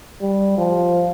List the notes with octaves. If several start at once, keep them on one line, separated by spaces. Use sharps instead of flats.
G3
F3